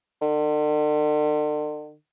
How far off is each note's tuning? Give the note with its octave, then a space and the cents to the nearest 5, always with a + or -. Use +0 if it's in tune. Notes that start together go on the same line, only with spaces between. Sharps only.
D3 +45